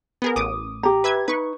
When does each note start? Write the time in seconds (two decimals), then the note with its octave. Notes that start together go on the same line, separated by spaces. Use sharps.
0.22 B3 G#4 A#4
0.36 A1 D6 D#6
0.83 G4 A#5
1.04 B4 E5 G#6
1.28 D#4 B4 C#6